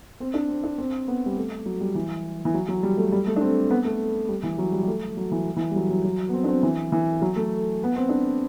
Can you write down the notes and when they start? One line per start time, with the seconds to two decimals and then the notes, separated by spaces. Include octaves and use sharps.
0.20 C4
0.34 D4
0.48 C4
0.64 D4
0.78 C4
1.08 B3
1.26 G3
1.37 A3
1.66 F#3
1.81 G3
1.95 E3
2.45 E3
2.54 F#3
2.69 F#3
2.83 G3
2.97 A3
3.12 G3
3.27 A3
3.36 D4
3.41 C4
3.70 B3
3.85 A3
4.29 G3
4.43 E3
4.58 F#3
4.72 G3
4.83 G3
4.88 A3
5.17 F#3
5.32 E3
5.56 E3
5.71 G3
5.76 F#3
5.89 F#3
6.05 F#3
6.29 B3
6.33 C4
6.44 D4
6.48 C4
6.63 E3
6.92 E3
7.22 F#3
7.36 A3
7.84 B3
7.96 C4
8.09 D4